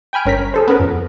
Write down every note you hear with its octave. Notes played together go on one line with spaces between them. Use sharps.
G5 G#5 B5 F6 D7
G1 C#4 A#4 A#5 B6
G#4 A4 C5
B3 C#4 A#4 B4
F2